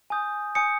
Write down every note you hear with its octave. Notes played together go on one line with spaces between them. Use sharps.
G#5 D#6 G6
G#5 D#6 G6 C#7